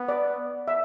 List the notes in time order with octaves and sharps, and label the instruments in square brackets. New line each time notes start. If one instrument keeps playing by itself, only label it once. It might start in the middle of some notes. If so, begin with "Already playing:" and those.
Already playing: [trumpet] B3
[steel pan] D5
E5